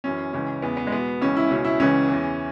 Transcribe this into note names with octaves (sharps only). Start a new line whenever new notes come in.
F#2 E3 C#4
C#2 C#3 E3 C#4
E2 C#3 E3 B3
B3
G#3
E2 B2 B3
C#2 C#3 E3 C#4
E4
C#2 B2 C#4
E4
C#2 C#3 E3 C#4
E2 E3